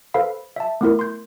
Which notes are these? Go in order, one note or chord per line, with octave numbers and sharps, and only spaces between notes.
A4 B4 C5 F5 B5
E5 A5
A3 B3 E4 A#4
C6 G6